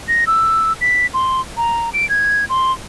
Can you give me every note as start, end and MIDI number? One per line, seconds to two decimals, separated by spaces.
0.08 0.25 94
0.27 0.73 88
0.81 1.06 95
1.14 1.41 84
1.57 1.90 82
1.94 2.08 98
2.10 2.45 92
2.49 2.72 84